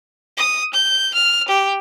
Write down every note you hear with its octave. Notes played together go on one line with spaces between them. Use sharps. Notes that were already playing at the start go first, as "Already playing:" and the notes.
D#6
G6
F6
G4